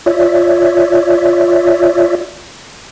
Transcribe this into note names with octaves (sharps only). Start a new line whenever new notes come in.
F4 C#5 D5 E5